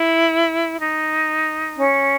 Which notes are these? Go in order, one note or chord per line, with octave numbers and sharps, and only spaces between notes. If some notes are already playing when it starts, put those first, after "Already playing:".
Already playing: E4
D#4
C#4